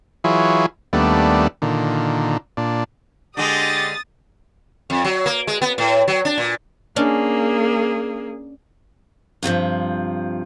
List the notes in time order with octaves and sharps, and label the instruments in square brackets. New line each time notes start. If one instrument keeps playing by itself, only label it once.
[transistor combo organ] E3 F#3 E4 F4 G#4 C#5
D#2 G3 A3 B3 D4
A#2 D3 D#3
A#2 D4
[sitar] D3 G#3 [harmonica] G4 D#5 [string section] D#6 A6
[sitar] F2
F#3
A#3
G#3
B3
A2
F#3
D4
A#2
[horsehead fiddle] A#3 G#4 [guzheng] C#4 D4
[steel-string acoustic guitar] G2 C3 D#3 F3